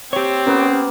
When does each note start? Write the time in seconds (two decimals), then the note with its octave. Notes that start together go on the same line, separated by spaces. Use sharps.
0.13 C4 G4 C#5
0.46 A#3 B3 C#4